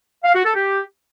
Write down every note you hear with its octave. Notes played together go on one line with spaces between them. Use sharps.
F5
F#4
A4
G4